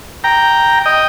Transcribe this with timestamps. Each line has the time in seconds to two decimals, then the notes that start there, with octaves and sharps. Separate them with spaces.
0.24 G5 A#5
0.86 D#5 G5